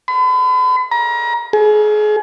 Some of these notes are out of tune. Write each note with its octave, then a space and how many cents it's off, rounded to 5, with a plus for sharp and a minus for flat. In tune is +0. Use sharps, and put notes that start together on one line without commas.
B5 +40
A#5 +35
G#4 +35